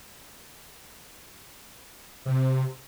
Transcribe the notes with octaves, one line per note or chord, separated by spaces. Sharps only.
C3